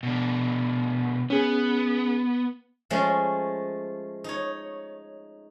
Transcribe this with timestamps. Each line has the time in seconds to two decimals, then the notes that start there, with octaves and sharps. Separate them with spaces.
0.03 B2 D4
1.30 B3 C#4 G#4
2.90 F3 G#3 A3 C#4
4.24 D#4 C#5